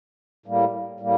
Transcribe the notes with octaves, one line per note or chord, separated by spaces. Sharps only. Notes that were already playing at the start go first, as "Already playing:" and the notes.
A2 G3 A#3
A2 G3 A#3